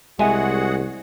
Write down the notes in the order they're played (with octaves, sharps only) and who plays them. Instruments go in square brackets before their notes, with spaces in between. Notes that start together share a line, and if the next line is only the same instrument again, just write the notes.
[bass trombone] C2 [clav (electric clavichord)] G#3 [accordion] F#4 G#4 F#5 [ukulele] E5 G#5